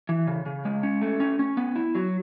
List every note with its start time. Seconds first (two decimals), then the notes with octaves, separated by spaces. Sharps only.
0.09 E3
0.27 C#3
0.46 C#3
0.65 G#3
0.83 C#4
1.02 A3
1.20 C#4
1.39 C#4
1.57 B3
1.75 E4
1.95 F#3